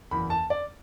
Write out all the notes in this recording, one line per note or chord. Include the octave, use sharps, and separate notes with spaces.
F#1 E2 E3 B5
A5
D5